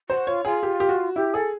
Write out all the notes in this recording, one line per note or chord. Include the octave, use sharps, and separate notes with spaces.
F#4 C5
F4 C#5
F4 G#4
G4
G4
F#4
E4 G4
G#4 A4